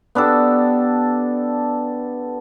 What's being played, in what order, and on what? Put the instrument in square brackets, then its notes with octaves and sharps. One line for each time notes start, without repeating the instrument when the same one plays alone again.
[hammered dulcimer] B3 D4 G4 A4